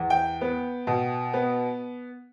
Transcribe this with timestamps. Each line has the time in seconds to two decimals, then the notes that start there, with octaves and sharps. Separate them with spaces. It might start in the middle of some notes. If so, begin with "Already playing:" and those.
Already playing: E2
0.10 G5
0.41 B3
0.87 B2
1.33 B3